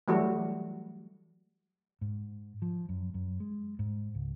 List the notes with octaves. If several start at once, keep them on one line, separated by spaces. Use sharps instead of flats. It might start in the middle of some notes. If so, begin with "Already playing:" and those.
E3 F#3 G3 A3 F#4
G#2
F3
F#2
F#2
G#3
G#2
C#2